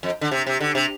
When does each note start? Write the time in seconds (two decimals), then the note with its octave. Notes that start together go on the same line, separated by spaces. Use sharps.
0.03 F2
0.21 D3
0.31 C3
0.46 C3
0.61 D3
0.75 C3